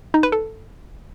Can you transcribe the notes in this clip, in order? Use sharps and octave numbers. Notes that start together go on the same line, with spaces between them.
D#4
B4
A4